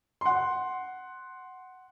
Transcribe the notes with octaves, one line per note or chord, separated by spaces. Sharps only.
F#5 C6